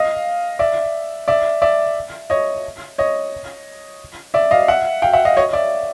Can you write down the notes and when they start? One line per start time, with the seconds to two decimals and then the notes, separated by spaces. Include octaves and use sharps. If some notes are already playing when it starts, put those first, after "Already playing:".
Already playing: D#5 F5
0.59 D5 E5
1.28 D5 E5
1.62 D5 E5
2.30 C#5 D#5
2.98 C#5 D#5
4.34 D5 E5
4.51 D#5 F5
4.68 E5 F#5
5.02 F5 G5
5.13 E5 F#5
5.25 D#5 F5
5.37 C#5 D#5
5.53 D5 E5